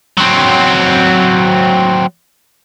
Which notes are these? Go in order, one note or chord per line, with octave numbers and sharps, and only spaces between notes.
F#3 C4